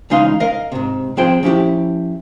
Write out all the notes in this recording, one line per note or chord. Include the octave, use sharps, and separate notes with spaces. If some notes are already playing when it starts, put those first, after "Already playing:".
C#2 E3 G#3 D#4 F5 C6
A#4 D#5 F5
G#2 C3
F3 C4 G#4 C5 G5
F3 C#4 E4 G4